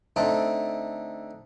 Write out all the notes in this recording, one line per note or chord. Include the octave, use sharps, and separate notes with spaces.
D3 A3 C4 D#4